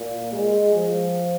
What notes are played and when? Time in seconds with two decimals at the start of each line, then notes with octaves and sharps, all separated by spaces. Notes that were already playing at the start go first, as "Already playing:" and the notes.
Already playing: A#2
0.32 G#3
0.75 F3